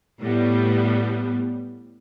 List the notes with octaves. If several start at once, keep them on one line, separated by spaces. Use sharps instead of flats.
A2 G3 B3